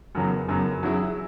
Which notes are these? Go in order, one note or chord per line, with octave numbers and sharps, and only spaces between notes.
F#2 C#3 F#3 B3
F#2 C#3 F#3 B3
F#3 C#4 E4 G#4